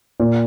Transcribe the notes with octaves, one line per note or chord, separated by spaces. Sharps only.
A#2